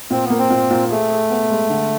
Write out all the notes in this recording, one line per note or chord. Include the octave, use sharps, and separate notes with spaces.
A#2 C4
B3
A#3
C4
A#2
A#2
A3 G#4
G#4
B3
G#3
D3